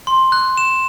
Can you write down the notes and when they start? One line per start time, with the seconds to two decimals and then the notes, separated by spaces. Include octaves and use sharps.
0.07 C6
0.32 F#6
0.57 E7